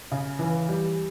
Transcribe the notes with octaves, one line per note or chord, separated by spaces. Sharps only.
C#3
E3
G3